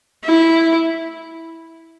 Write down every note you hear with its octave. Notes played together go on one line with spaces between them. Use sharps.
E4